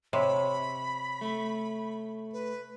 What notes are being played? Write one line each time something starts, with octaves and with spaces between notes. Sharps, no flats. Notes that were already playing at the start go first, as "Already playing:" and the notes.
C3 C#5 B5
A3
B4